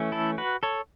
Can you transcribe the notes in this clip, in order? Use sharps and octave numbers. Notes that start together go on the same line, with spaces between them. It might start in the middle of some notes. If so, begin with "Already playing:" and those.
Already playing: E3 A3 C#4
E4 A4
F#4 B4
A4 C#5